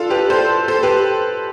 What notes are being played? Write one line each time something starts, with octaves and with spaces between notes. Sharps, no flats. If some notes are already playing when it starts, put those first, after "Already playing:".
Already playing: D4 F4 A4
G4 B4
A4 C5
A4 C5
G4 B4